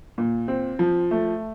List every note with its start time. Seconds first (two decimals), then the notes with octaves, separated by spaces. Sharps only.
0.18 A#2
0.48 C4
0.79 F3
1.11 A3